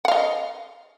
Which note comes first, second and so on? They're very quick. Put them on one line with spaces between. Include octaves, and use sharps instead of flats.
F#5 F5 D#5